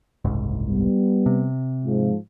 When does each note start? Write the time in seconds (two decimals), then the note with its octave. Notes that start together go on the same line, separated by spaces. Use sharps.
0.25 F#1 C2 G#2
0.68 G3 B3
1.26 C3
1.85 G#2 F3 G#3